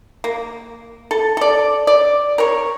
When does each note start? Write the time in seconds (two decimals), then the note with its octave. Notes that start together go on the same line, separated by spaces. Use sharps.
0.24 A#3
1.11 A4
1.37 A4 D5
1.87 D5
2.38 A#4 C#5